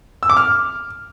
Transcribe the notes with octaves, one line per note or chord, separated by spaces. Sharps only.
E6
D6
F6